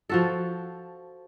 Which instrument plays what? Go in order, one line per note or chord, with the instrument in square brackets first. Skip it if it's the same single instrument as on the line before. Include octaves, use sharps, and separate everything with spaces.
[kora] F3 F#4 A4